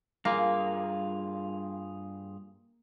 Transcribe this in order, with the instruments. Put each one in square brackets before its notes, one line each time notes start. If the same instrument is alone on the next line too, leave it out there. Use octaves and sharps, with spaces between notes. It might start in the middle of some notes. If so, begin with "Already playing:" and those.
[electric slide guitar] G2 F4 G#4 [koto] A#3